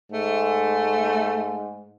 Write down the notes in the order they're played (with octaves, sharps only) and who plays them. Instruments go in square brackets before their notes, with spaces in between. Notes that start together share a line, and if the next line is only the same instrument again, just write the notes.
[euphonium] G#2 [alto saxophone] A3